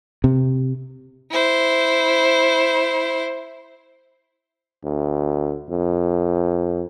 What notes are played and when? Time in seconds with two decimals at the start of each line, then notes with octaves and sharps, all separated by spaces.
0.24 C3
1.31 E4 C5
4.84 D2
5.70 F2